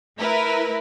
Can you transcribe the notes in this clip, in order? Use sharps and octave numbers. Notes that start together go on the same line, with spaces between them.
A3 E4 A#4 B4